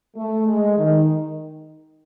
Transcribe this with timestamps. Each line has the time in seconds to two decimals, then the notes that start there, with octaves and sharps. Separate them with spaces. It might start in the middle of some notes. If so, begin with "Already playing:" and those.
0.16 A3
0.46 G#3
0.77 D#3